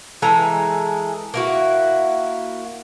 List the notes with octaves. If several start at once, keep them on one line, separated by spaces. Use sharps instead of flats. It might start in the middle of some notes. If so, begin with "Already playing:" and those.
E3 G#3 A4 A#5
A#3 E4 F#4